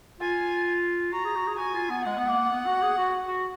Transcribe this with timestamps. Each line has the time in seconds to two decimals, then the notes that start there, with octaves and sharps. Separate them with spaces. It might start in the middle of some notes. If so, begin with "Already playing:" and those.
0.21 F4 G#5
1.12 F#4 A#5
1.25 G#4
1.36 F#4
1.47 G#4
1.58 F#4 G#5
1.74 F4
1.90 B3
2.05 G#3 F#5
2.18 B3
2.27 A#3
2.51 B3
2.66 F#4
2.82 G#4
2.97 F#4
3.28 F#4